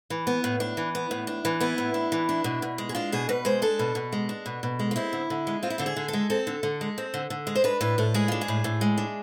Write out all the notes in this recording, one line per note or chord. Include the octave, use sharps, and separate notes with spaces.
E3
B3
A2
D4
E3
B3
A2
D4
E3
B3 E4
A2
D4
E3
D4
B2
B2
G#3
G#4
D4 F4
B2 G#4
B2 B4
G#3 C5
D4 A4
B2
B2
G#3
D4
B2
B2
G#3
F4
C4 E4
D3
D3
G#3
C4 F4
E4
D3 F4
G#4
D3
A4
G#3
C4 A4
D3
D3
G#3
C4
D3
D3
G#3
C5
D4 B4
A2 B4
A2 A4
G#3 G#4
D4 F4
G#4
A2
A2
G#3
D4